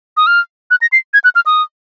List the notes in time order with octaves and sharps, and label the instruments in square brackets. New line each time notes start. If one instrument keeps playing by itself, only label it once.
[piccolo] D#6
F6
F#6
A#6
C7
G#6
F#6
F6
D#6